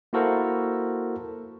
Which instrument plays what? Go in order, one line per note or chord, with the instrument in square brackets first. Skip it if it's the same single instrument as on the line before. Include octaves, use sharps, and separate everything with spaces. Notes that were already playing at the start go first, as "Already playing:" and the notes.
[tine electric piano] A#3 E4 F#4 A4 A#4 C5